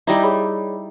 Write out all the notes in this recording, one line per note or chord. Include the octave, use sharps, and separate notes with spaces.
G3 D#4 E4 A#5 A#6
G#4 C#5 B5